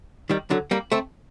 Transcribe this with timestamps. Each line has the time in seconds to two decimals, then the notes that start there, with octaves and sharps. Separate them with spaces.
0.30 D#3 G3
0.50 D3 F#3
0.71 G3 A#3
0.92 A3 C4